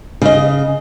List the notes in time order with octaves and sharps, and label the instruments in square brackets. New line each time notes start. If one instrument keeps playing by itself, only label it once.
[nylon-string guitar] C#3 D#5